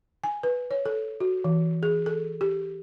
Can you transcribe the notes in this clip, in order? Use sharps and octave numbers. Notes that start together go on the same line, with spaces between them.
G#5
B4
C#5
A4
F#4
E3
G#4
A4
G4